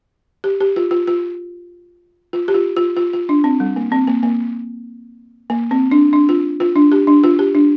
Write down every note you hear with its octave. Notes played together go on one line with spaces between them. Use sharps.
G4
G4
F4
F4
F4
F4
G4
F4
F4
F4
F4
D4
C4
G3
A#3
C4
A#3
A#3
A#3
C4
D4
D4
F4
F4
D4
G4
D4
F4
G4
D4